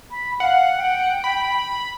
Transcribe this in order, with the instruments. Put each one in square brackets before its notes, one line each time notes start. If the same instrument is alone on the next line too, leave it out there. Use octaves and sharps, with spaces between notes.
[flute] B5
[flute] F5 [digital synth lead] F#5
[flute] G5
[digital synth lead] B5